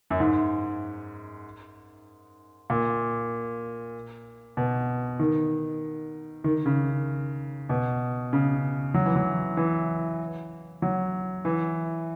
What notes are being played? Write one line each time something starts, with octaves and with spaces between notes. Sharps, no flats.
F#2
G#2
A#2
B2
D#3
D#3
C#3
B2
C#3
F#3
E3
F#3
E3
F#3
E3